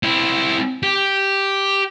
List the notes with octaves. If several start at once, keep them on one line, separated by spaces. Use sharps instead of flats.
C4 E4
G4